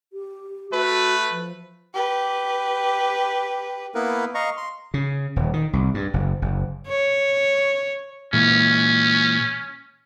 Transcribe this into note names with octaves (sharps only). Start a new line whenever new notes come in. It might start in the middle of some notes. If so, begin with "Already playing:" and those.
G4
A3 F#4 B4
F3
G4 B4
A#3 B3 E4 A#4 B4
D#5 F5 A#5 C#6
C6
C#3
D#1
D#3
C2
G2
F#1
F#1
C#5
A#2 E3 G#3 C#4